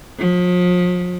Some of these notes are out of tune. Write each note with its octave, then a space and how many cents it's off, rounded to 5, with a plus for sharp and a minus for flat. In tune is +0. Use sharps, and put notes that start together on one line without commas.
F3 +40